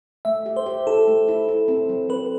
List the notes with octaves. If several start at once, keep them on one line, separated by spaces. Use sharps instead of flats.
A3 E5
G4
C5
G4
E4 A4
A3
E4
E4
C4
F#3
C4 B4